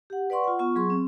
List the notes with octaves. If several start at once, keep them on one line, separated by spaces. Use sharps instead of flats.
G4 F#5
B4 D5 F#5 C6 C#6
F4 F#5
B3 F4 C#6
F#3 G#4 C6 C#6
C4